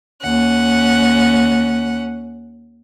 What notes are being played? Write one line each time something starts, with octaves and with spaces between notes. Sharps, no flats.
D#2 C#4 F#5